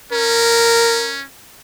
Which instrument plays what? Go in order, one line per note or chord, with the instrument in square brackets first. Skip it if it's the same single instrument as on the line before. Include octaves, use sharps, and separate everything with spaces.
[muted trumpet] C#4 [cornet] A#4